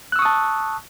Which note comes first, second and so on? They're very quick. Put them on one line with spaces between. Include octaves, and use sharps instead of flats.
F#6 E6 C#6 D#6 A5